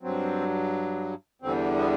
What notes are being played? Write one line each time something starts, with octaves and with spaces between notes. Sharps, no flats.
G2 F#3 C4
E2 D3 G3 C4
B3